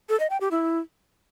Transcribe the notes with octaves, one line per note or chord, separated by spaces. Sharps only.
A4
D#5
G5
G4
E4